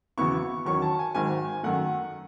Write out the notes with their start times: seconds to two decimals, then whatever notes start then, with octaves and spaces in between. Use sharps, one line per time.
0.18 E2 C#3 F#3 B3 E4 C#6
0.65 E2 D#3 F#3 C#4 C#6
0.82 A5
0.99 G#5
1.15 G#1 G#2 D#3 F#3 G#5
1.63 F#2 D#3 A3 F#5